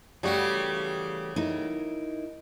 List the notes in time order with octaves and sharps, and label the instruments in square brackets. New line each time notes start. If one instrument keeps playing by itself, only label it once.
[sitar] C#3 G3 F#4 [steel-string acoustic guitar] E3 A3 G4
[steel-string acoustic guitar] D#4 E4 A#4